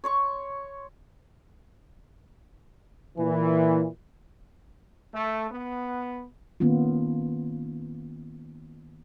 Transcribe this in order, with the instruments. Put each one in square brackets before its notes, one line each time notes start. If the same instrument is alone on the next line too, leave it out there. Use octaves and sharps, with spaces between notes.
[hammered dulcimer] C#5 C6 C#6
[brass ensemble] A#2 E3
[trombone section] A3
B3
[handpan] D#3 A#3 B3 C#4 F4